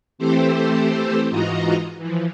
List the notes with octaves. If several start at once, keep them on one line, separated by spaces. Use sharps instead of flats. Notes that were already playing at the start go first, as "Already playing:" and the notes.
E3 A3 C4 G4 A4 C5
G#2 E3 F4 F#4 D#5 A#5
E3 F3